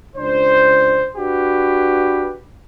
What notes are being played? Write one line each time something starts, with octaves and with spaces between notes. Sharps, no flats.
C#2 D4 C5
D4 F#4 G4 B4